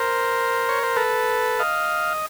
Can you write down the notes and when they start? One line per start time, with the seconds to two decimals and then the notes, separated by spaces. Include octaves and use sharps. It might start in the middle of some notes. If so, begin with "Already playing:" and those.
Already playing: A#4 C5
0.69 C#5
0.83 C5
0.96 A4 B4
1.59 D#5 F5